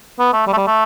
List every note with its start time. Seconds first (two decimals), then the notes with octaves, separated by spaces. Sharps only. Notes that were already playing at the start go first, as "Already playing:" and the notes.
0.19 B3
0.33 A3
0.47 G3
0.53 A3
0.57 G3
0.67 A3